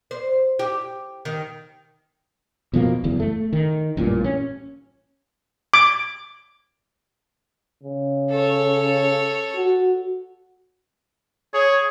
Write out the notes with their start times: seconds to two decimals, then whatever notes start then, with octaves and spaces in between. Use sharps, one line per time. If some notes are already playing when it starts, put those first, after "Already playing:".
0.11 C5
0.59 G4
1.25 D#3
2.73 B2 F3 G#3 A#3
3.04 F#1 E2
3.19 A3
3.53 D#3
3.97 A1 G2 A#2
4.24 C#4
5.73 D6
7.83 C#3
8.30 A4 C#5
9.55 F#4
11.54 G#4 C#5